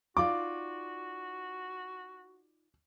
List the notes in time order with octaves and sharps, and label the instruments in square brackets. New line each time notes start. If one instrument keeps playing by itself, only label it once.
[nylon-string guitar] D#4 F4 D5 [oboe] F#4 [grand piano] D6